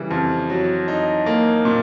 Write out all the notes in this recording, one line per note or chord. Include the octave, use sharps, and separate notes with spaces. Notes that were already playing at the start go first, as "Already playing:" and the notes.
Already playing: C#3 E3 G3
F2
F#3
D#4
A#3
A#2